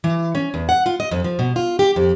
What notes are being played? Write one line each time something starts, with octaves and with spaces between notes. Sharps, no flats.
E3
C#4
E2
F#5
F4
D#5
F2
F3
B2
F4
G4
F2